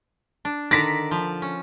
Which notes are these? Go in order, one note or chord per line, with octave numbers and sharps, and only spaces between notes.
D4
D3 D#3 D5 A#6 B6
F3
C#4